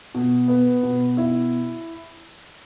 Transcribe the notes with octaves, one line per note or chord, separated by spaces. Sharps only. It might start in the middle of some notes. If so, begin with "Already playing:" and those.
B2
B3
B2
E4